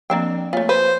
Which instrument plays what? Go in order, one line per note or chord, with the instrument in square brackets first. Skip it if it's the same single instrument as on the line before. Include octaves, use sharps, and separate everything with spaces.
[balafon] F3 C4 [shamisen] A#3 D4 G5
[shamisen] A3 F4 [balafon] A#3 C#5 G#5
[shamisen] B4 [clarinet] C5